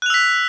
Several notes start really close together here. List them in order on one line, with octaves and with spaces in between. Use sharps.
F#6 F7 E6 B6